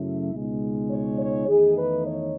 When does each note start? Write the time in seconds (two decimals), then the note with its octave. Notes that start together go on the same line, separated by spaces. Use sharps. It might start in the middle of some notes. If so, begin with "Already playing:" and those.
Already playing: F#2 C#3 F#3 A3 E4
0.33 C#2 B2 G#3 D#4
0.90 C#5
1.19 C#5
1.48 E2 D#3 A3 D#4 G#4
1.77 B4
2.06 C#5